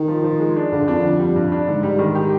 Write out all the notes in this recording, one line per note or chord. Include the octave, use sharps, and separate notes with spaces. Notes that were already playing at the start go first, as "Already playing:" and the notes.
Already playing: D#3
F3
F3
G#3
D4
G2 D3
F2 D4
D3
G3
G2
D4
G#2 D3
G3
D#3
G4